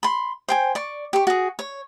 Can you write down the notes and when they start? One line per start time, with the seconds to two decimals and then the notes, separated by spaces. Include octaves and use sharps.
0.03 B5 C6
0.48 C5 G5 G#5
0.75 D5 C#6
1.13 G4 C#6
1.27 F#4 G#4
1.59 C#5